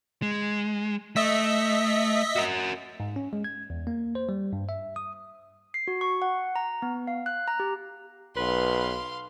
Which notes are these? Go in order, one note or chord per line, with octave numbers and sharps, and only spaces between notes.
G#3
A3 D#5 E5 B6
F#4 A#4
G#2
C#4
G#3
G#6
E2
A#3
C5
G3
G2
E5
D#6
C7
F#4
C#6
F#5
A#5
B3
F5
F#6
A#5
G4
B1 B4 F5 C6